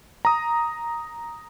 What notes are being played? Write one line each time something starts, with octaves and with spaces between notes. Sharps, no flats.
A#5 D#6